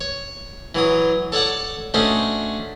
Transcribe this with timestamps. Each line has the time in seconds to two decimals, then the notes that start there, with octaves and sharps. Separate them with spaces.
0.01 C#5
0.75 E3 F#3 D#6
1.32 A4 C#5 D5 F#5 A5
1.94 A3 C#4 D4 F#4 C5 D#5